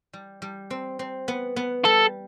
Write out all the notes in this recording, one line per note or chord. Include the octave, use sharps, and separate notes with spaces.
G3
G3
C4
C4
B3
B3
G3 A4